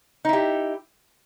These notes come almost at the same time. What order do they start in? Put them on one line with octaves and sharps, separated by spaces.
D#4 E4 G4